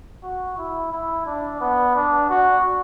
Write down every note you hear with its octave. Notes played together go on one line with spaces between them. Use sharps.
F#4
E4
E4
D4
B3
D4
F#4